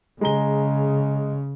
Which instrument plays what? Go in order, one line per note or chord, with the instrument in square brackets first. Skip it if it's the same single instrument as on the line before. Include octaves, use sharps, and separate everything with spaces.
[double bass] C#3 [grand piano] G#3 A#5 G7